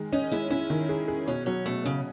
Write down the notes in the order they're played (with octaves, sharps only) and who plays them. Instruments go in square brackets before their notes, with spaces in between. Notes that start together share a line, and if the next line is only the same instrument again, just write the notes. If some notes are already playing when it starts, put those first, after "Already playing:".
Already playing: [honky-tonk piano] D#3 G#3
[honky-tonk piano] C#4 [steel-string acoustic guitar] D#4
[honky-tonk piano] G#3 [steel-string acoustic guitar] E4
[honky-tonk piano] C#4 [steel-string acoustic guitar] E4
[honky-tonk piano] D#3
G#4
G#4
[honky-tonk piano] B2 [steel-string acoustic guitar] C#4
[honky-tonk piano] F#3 [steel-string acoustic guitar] C#4
[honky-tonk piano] B2 [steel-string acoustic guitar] A3
[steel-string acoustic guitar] C#3 [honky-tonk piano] C#4